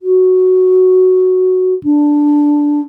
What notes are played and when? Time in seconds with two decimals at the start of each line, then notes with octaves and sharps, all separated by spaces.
0.02 F#4
1.83 D4